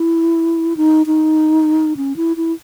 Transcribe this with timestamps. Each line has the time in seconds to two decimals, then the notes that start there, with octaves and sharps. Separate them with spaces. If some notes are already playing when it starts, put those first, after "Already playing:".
Already playing: E4
0.77 D#4
1.06 D#4
1.97 C#4
2.16 E4
2.37 E4